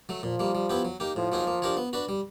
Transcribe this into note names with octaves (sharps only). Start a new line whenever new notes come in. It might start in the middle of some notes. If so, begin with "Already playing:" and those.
F#3 A3
A#2 F3
G3 A#3
G3
B3 E4 G4
F#3
A#3 D#4 G4
A2 F3
F#3 A#3 D#4 G#4
A#3
D4 G4 A#4 C#5
B3
D4 F#4 B4
G3